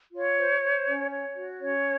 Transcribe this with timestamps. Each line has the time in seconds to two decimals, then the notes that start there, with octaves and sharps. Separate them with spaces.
0.14 F4 C#5
0.37 C5
0.62 C5
0.87 C#4
1.11 C#5
1.35 F#4
1.60 C#4 C#5